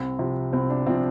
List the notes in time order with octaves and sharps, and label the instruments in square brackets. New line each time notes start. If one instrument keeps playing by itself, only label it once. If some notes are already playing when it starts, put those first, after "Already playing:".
Already playing: [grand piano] C2 [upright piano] C4
[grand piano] C3 F3
[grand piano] C2 [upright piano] C4
[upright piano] D4
[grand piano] C3 F3 [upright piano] C4